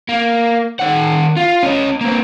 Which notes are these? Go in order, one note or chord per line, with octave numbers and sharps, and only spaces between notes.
A#3
D#3 F#5
F4
C#4 D#5
A#3 C4